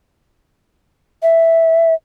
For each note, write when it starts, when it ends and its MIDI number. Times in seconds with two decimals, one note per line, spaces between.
1.23 1.94 76